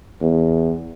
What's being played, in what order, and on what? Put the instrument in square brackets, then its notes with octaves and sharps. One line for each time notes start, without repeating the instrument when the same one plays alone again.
[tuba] E2